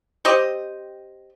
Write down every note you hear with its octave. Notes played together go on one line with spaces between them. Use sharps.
C4 G4 D#5